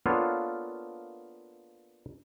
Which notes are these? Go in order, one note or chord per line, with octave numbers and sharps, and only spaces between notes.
A#3 B3 D4 F4 A4 C#5